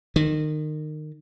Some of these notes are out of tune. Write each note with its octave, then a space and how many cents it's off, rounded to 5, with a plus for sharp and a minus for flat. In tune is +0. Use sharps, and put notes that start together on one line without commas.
D#3 -25